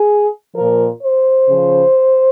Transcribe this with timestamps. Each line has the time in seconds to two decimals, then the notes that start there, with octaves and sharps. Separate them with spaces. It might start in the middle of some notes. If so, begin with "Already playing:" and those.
Already playing: G#4
0.55 A#2 F3 A#4
1.02 C5
1.49 C#3 F3